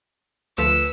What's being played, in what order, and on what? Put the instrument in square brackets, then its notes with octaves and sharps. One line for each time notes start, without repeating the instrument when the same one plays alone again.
[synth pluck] D2 F3 A3 [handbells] B4 B6 [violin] E6